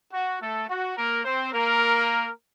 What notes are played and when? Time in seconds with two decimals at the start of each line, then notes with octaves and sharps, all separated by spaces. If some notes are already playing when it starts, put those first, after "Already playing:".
0.12 F#4
0.40 A3 A4
0.68 F#4
0.96 A#3 A#4
1.25 C4 C5
1.53 A#3 A#4